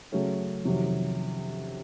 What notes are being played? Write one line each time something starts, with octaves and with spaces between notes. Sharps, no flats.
C#3 F#3 A3 C#4
F2 C3 D#3 F#3